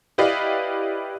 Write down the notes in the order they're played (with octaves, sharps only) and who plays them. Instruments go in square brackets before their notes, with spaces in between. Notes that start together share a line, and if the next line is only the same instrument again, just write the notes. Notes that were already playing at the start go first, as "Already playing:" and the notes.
[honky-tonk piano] E4 G4 B4 D5 D#5 F5